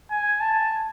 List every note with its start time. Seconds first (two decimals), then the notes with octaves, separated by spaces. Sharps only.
0.11 G#5
0.41 A5